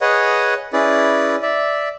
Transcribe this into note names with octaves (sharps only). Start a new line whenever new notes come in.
G#4 B4 C#5 D#5 F#5
C#4 E4 G#4 B4 D5
D5 E5